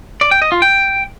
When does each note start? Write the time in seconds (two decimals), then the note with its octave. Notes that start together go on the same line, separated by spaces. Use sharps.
0.21 D5
0.31 G5
0.42 D#5
0.52 F4
0.62 G5